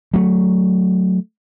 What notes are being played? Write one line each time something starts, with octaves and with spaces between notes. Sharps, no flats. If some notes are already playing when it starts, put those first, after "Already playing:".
F#3 A3